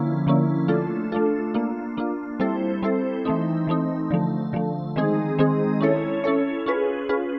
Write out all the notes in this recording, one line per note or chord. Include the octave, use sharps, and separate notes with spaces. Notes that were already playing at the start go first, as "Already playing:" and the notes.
Already playing: D3 F3 A#3 C#4 E4
D3 F3 A#3 C#4 E4
A3 D4 F4 A4
A3 D4 F4 A4
A#3 D4 F4
A#3 D4 F4
G3 C4 E4 A4 C5
G3 C4 E4 A4 C5
E3 A3 C4 D#4
E3 A3 C4 D#4
D3 F3 A3
D3 F3 A3
D#3 G#3 C4 D#4 G#4
D#3 G#3 C4 D#4 G#4
C#4 E4 A4 C#5
C#4 E4 A4 C#5
C#4 F4 G#4 B4
C#4 F4 G#4 B4